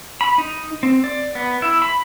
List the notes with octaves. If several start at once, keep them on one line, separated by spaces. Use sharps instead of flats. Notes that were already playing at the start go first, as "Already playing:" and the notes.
B5
D#4
C4
D5
B3
E4
B5